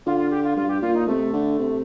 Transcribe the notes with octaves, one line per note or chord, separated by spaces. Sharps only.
D3 F4
F4
G4
F4
G2 F4
G4
A#2 F4
D#4
C3 A3
D3
C3